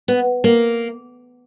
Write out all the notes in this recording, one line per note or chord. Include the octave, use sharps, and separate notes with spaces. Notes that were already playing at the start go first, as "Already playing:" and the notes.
B3
A#3